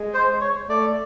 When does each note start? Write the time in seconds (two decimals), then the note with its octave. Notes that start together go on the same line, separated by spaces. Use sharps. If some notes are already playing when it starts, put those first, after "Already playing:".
Already playing: G#3
0.14 C5
0.41 C#5
0.69 A3 D5